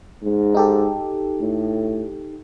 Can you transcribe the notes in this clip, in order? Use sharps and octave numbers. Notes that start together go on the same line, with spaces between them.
G#2
D#4 G4 A4
A2